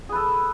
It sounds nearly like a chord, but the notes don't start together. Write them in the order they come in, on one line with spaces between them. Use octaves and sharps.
G#4 B4 A4